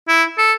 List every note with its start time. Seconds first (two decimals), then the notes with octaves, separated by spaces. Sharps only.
0.08 E4
0.38 A4